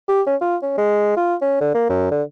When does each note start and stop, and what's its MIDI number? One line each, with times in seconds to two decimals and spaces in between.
0.08 0.21 67
0.27 0.36 61
0.41 0.56 65
0.62 0.75 61
0.78 1.17 56
1.17 1.35 65
1.41 1.57 61
1.61 1.72 50
1.74 1.88 58
1.89 2.08 42
2.11 2.22 50